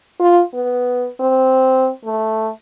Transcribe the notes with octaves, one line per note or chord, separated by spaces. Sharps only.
F4
B3
C4
A3